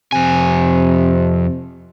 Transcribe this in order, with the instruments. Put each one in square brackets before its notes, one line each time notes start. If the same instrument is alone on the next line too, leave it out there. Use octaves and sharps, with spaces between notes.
[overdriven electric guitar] F2 G#5 [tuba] C3